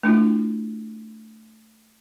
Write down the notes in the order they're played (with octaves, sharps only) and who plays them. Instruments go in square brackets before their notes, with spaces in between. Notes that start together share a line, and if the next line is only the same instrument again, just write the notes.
[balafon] A3 D4 E4 F4